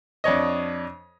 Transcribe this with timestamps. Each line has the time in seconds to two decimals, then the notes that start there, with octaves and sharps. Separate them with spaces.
0.24 F2 D4 C#5 D#5